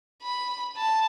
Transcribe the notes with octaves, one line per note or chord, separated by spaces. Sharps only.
B5
A5